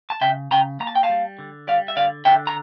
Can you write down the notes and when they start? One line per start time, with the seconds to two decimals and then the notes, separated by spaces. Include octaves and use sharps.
0.10 A5
0.21 C#3 E5 G5
0.51 C#3 G5 A#5
0.80 A#3 A#5
0.87 A5
0.95 G5
1.03 F5 A5
1.09 G3
1.39 D3
1.67 G3 D5 F5
1.88 E5
1.96 D3 D5 F5
2.25 D3 E5 G5
2.47 A#5